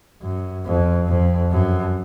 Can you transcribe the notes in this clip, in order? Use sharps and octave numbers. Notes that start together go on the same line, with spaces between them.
F#2
F2
F2
F#2